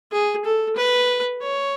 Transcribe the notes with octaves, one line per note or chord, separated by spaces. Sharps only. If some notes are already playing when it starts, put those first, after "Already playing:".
G#4
A4
B4
C#5